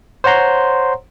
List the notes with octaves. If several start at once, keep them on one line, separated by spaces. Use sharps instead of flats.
C5 C#5 F#5 A#5 C6